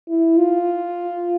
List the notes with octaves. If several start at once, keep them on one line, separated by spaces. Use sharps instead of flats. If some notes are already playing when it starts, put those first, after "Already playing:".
E4
F4